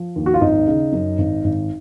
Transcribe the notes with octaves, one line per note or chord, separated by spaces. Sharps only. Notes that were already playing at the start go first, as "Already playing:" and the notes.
Already playing: F3
D#2
F#4
F4
G#1 D#4
C#3
F#2
G#1
G#1